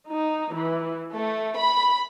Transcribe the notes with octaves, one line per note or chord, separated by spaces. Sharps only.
D#4
E3
A3
B5